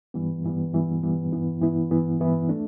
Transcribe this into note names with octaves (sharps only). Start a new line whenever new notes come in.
G2 E3 G3 B3
G2 E3 G3 B3
G2 E3 G3 B3
G2 E3 G3 B3
G2 E3 B3 E4
G2 E3 B3 E4
G2 E3 B3 E4
G2 E3 B3 E4
A3 D4